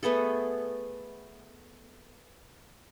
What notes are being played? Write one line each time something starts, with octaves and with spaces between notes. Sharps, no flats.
A3 B3 G#4 A4